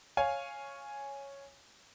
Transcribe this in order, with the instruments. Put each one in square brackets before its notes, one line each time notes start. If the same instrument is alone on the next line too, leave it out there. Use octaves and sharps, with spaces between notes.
[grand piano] C#5 F5 G#5